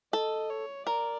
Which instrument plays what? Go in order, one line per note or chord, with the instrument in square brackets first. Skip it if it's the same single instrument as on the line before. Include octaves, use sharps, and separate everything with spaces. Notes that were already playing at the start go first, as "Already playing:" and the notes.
[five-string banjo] A4 [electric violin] D#5
[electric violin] C#5
[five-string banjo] A#4 [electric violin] D5